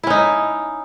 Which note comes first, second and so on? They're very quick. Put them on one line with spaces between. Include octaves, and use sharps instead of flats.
E4 C#4 D#4